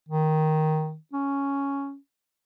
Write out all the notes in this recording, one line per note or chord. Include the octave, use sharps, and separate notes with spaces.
D#3
C#4